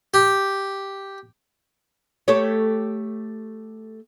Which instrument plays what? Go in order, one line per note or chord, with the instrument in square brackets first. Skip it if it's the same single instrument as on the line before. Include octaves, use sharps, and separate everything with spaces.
[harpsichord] G4
[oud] A3 G4 C#5